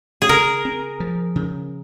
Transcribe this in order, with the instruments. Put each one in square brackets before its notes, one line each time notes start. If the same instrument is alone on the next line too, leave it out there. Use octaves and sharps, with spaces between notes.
[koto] G#4
[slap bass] C#3 [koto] A#4
[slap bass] C4
F3
C#3